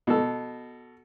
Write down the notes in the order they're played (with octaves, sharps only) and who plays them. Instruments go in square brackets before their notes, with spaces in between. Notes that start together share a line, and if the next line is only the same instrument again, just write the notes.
[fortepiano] B2 A4